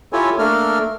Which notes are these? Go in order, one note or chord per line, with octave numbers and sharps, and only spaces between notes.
E4 F4 G4 A4 C#5 G#5
A3 A#3 D4 A4 A#4 F6